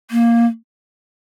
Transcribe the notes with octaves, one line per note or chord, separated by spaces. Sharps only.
A#3